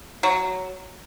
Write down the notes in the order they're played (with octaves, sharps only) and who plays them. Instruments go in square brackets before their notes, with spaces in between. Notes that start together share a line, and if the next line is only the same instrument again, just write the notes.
[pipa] F#3